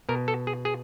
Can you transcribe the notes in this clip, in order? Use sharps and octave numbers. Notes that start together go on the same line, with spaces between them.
B2 A#4
A4
G#4
G#4